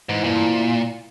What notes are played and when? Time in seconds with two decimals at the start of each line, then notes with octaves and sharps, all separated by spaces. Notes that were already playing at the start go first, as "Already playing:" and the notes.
0.09 G#2 E3
0.24 G2 A#2
0.41 C4
0.56 E4